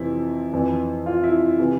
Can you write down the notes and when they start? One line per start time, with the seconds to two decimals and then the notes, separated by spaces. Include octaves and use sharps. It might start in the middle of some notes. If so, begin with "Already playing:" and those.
Already playing: F2 C3 E3 E4
0.53 F2 E3
1.06 F4
1.23 E4
1.59 C3 E3